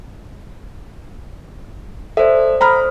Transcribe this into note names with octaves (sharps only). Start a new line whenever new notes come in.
A4 C5 D5 E5
C5 A#5 B5 D#6 F6